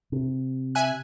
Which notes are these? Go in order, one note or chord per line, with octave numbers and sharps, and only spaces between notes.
C3
E5 G#5 F#6